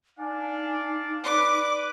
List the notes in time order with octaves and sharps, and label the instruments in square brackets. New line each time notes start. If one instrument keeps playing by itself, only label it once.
[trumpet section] D4 D5 F5 [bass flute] D#4 [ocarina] G#5
[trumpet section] B4 [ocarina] D5 [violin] D6